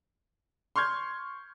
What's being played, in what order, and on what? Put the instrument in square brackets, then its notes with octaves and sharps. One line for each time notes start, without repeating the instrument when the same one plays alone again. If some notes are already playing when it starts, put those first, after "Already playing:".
[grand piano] C6 C#6 F6 G6 G#6